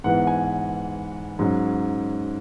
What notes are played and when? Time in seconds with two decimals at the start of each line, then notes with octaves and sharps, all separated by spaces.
0.04 G#2 E3 B3 F#5
0.27 G#5
1.39 G#2 F#3 C#4